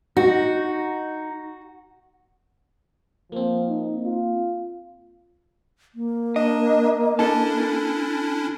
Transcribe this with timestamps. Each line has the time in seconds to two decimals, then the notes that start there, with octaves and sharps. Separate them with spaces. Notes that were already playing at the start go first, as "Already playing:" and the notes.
0.17 D#4 F#4
3.32 F3 A#3 C4
3.68 D#4
4.05 F4
5.95 A#3
6.36 D4 D#5
7.19 C#4 D4 E4 A4 A5